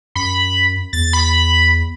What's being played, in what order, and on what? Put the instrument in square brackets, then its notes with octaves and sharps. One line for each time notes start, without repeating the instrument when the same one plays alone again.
[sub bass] F#2 [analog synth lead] B5
[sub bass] E2 [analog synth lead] A6
[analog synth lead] B5